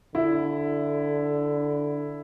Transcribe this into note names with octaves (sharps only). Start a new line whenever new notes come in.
D3 E4